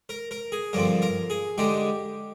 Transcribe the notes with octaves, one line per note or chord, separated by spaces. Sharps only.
A#4
A#4
G#4
G2 D3 F3 C4 A#4
A#4
G#4
D3 G#3 D#4 G4